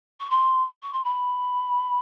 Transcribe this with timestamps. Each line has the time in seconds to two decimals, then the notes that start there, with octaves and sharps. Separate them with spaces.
0.20 C#6
0.30 C6
0.83 C#6
0.93 C6
1.04 B5